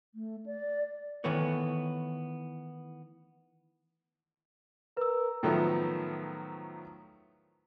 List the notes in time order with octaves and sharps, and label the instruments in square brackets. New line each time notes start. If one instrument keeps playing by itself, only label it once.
[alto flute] A3
D5
[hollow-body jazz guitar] D#3 E3 A3 B3 C#5
[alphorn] A#4 [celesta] B4 E6
[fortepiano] A2 D#3 F3 F#3 A3 B3